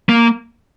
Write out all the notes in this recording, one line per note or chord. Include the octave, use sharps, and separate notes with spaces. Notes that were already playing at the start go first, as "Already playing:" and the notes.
A#3